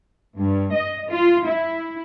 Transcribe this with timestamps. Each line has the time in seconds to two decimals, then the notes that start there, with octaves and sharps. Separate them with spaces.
0.37 G2
0.72 D#5
1.11 F4
1.45 E4